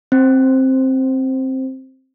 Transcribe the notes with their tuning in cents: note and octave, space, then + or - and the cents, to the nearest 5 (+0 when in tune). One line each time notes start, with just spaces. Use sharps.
C4 +10 C5 +0